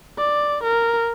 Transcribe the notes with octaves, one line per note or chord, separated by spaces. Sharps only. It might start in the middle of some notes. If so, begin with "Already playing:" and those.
D5
A#4